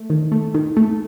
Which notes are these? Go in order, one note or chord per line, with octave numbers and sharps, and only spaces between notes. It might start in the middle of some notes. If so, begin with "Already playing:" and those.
Already playing: A3
D#3
A3
D#3
A3